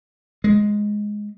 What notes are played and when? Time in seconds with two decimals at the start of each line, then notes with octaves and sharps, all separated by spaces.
0.44 G#3